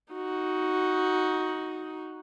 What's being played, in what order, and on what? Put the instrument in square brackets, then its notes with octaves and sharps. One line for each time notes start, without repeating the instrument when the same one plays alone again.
[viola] D#4 F#4